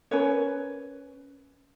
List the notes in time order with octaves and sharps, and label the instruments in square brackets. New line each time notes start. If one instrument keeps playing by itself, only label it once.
[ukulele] C#4 A#4 B4 C#5